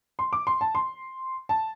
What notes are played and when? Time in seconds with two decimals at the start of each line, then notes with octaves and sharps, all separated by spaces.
0.19 C6
0.33 D6
0.47 C6
0.61 A5
0.75 C6
1.49 A5